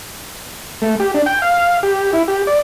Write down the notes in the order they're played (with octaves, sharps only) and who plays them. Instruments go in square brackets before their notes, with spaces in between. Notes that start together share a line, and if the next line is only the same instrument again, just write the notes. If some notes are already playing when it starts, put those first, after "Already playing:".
[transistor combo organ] A3
G4
D4
G5
F5
G4
E4
G4
D5